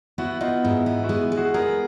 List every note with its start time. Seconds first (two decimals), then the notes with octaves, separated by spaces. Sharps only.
0.18 B3 E4 F#4
0.41 B3 D#4 F4
0.64 G#2 E4
0.86 B3 E4
1.04 E4 F#4
1.09 G#3
1.32 G#3
1.37 F#4 G#4
1.54 B3 G#4 A#4